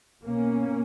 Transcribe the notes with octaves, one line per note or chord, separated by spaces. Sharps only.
B2 A#3 C#4